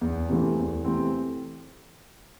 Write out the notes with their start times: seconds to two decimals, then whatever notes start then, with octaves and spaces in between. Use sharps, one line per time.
0.01 E2
0.29 C3 E3 A3 C4
0.57 E2
0.84 C3 E3 A3 C4